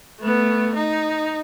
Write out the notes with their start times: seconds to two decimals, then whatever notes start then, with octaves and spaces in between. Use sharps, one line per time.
0.20 A3 B3
0.75 D#4